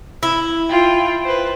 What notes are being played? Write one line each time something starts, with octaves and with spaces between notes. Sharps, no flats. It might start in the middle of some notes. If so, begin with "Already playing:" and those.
E4
F4 G5
B4 C5